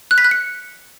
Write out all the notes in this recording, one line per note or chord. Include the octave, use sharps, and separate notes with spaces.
F#6
B6
F#6
C#7